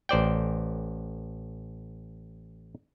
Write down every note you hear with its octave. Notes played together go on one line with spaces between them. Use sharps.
A1 C5 D5 G5